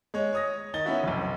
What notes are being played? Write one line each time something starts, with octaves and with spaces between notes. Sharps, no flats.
G#3 C#5
C#5 D#6 A#6
D#3 D#5 A6 G7
B3 C#4 D#4 E4 F#4
F1 B1